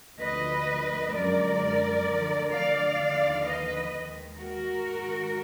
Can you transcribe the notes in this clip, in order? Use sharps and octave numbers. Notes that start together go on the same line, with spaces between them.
D2 D3 F3 B4 D#5
F#2 D3 F3 G#3 A#4 D5
D2 D3 F3
D5 F5
D#2 D3 F3
B4 D#5
D#2 D#3 G#3
F#4 A#4
G#2 D#3 G#3